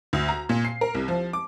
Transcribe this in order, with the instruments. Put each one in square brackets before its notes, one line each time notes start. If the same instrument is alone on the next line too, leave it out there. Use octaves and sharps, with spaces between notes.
[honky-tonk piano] D2
A#5
A#2
C7
A#4
C2
F3
D6